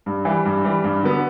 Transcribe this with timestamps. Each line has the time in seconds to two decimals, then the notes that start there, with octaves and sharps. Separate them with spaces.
0.06 G2
0.25 E3 G3
0.45 G2
0.64 E3 G3
0.84 G2
1.03 D3 F#3 B3